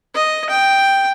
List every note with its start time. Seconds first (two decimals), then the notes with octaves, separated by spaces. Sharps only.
0.14 D#5
0.50 G5